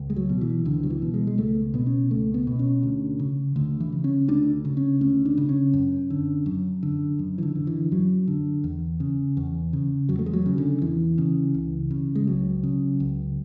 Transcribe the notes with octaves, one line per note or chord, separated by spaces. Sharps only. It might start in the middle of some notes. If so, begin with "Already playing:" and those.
Already playing: C#2
G#3
F#3
B2
E3
C#2 D3
F#3
E3
B2
G#3
G#3
C#2 A3
B2 B3
C#4
C#2 A3
B3
B2
C#4
D2
C#3
D2 D3
E3
C#3
C#4
D2 D4
C#3
C#4
D2 C#4
D4
C#3
C#4
F#2
D3
F#2
D3
F#2
E3
D3
D3
E3
F#2 F#3
D3
E2
C#3
E2
C#3
E2 F#3
A3
G#3
F#3
C#3
D3
E2 E3
C#3
C#2
C#3
G#3
C#2 F#3
C#3
C#2